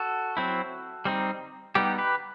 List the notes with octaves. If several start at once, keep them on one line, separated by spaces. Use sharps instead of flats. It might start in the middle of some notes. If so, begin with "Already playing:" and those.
Already playing: F#4 A4
F#3 C4 E4
G3 C4 D#4
G3 B3 D#4 G4
G4 B4